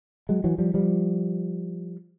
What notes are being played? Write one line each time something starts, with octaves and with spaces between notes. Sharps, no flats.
F#3 G#3
E3 F#3
F3 G3
F3 G3